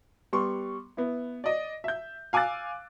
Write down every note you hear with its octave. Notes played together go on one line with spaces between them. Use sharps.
G3 B3 C6 C#6
B3 E4
D5 D#5
E5 G6
F5 G#5 D6 E6 F#6 A6